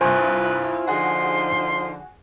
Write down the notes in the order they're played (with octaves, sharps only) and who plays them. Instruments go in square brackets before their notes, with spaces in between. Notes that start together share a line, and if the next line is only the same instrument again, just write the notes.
[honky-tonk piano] C2 G2 [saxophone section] E4 F4 [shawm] B4 [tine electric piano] C5 G#5 C#6
[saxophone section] D3 F3 D#4 [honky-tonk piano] F#4 G#4 [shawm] C6